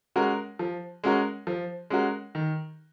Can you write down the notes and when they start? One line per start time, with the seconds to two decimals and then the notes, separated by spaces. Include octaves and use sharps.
0.16 G#3 C#4 F#4 A#4
0.59 F3
1.04 G#3 C#4 F#4 A#4
1.47 F3
1.90 G#3 C#4 F#4 A#4
2.35 D#3